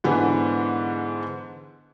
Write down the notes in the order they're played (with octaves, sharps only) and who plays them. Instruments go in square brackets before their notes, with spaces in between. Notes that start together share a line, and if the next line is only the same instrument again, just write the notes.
[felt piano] G#2 D3 E3 B3